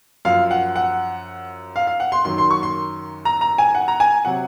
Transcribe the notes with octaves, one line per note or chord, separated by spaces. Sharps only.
F#2 F3 F5
F#5
F#5
F5
F5
F#5
C6
F#2 D#3 F#3 C6
C6
C#6
C6
A#5
A#5
G#5
F#5
A#5
G#5
C3 F#3 F#5